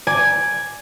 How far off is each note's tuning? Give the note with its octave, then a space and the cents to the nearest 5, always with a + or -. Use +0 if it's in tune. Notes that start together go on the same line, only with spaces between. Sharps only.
D5 +0 G#5 +0